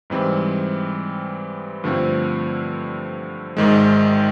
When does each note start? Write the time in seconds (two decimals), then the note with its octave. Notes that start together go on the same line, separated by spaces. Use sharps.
0.10 G#2 E3 G3 C4
1.84 G2 D3 F3 A3 C4
3.57 G#1 G#2 D#3 G#3